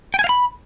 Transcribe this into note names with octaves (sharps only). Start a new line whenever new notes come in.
G5
G#5
F5
B5